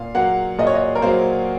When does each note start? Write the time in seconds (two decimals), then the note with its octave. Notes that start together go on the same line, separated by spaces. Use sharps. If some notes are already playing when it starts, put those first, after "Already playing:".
Already playing: A#2 F5
0.15 F#3 A#3 F#5
0.58 A#2 D#5
0.67 C#5
0.75 D#5
0.95 A#4
1.02 F#3 A#3 C5